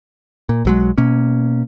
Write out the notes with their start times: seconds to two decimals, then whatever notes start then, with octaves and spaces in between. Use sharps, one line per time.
0.49 A#2
0.65 B1 F#3 G#3
0.98 B2 A#3 C#4